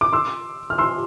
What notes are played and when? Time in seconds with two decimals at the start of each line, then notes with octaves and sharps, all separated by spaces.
0.01 D6
0.13 C6 E6
0.70 F6
0.78 C6 E6